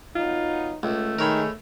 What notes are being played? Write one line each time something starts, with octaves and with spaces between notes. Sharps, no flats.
F#3 B3 D#4 F4
C#2 A3
D#3 G#3 A#4 C#5 B5